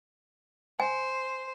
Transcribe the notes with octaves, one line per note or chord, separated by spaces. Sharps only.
C5 G#5